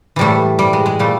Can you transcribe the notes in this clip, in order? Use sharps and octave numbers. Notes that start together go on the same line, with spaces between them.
A2 E3 G3 A3
G3
G#3
G#3
A#2 G3 A3